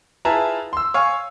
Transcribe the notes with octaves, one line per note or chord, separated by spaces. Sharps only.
E4 F4 G#4 B4 A5 A#5
C6 E6
C#5 F5 G#5 C#6